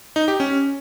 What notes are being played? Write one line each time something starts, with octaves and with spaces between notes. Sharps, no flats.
D#4
G4
C#4